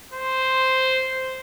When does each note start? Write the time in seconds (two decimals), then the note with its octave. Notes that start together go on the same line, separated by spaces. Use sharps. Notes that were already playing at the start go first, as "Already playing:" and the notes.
0.13 C5